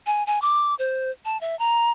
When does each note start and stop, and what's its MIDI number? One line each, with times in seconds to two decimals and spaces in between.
0.06 0.25 80
0.27 0.41 80
0.42 0.75 86
0.79 1.11 72
1.25 1.39 81
1.41 1.58 76
1.59 1.91 82